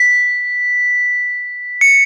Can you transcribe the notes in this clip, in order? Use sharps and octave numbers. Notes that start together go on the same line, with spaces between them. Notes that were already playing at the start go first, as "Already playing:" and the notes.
Already playing: B6
C#7